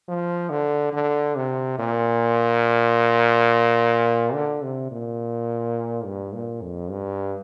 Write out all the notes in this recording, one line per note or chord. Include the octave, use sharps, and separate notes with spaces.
F3
D3
D3
C3
A#2
D3
C3
A#2
G2
A#2
F2
G2